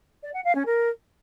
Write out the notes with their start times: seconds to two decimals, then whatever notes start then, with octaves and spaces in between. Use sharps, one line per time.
0.23 D5
0.34 F#5
0.44 F5
0.55 C#4
0.66 A#4